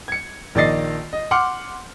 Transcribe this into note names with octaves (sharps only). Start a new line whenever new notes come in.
G#6 C#7
A#1 D#3 D5 D#5 A6 C7
D#5
F#5 C6 D6 F6 C#7